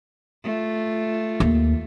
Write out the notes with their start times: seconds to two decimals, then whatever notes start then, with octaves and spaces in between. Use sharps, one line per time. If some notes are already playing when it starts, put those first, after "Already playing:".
0.44 A3 F4
1.40 D#2